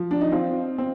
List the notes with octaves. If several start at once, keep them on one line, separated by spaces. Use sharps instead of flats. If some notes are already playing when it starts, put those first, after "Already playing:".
Already playing: F3
D4
D#4
C4 F4
C4